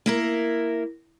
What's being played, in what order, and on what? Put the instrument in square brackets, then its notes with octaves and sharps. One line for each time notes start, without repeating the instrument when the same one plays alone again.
[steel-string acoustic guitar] A#3 E4 A#4